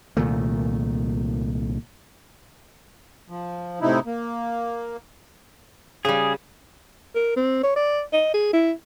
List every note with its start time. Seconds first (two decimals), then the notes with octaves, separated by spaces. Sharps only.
0.17 C2 A#2 D#3 A3
3.29 F3
3.81 A2 C3 D#4 E4
4.06 A#3
6.05 C#3 G3 G#4
7.15 A#4
7.36 C4
7.63 C#5
7.75 D5
8.13 D#5
8.34 G#4
8.53 E4